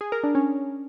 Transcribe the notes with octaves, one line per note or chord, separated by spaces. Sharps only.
G#4
A#4
D4
C#4